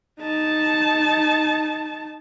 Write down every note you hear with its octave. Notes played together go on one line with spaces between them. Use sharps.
D#4 A5